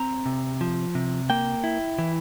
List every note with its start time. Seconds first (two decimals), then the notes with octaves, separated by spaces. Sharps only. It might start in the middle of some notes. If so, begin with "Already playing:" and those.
Already playing: C4 A#5
0.26 C3
0.61 F3
0.95 C3
1.30 A#3 G5
1.64 E4
1.99 E3